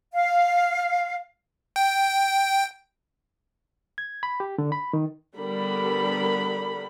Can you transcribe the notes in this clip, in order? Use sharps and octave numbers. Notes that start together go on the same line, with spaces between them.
F5
G5
G#6
B5
G4
D3
B5
D#3
D3 G3 B3 D4 A#4 B5